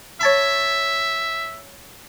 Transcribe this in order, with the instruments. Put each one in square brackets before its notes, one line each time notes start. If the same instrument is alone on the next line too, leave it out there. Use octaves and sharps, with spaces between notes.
[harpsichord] C#5 A5 B5 [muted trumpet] E5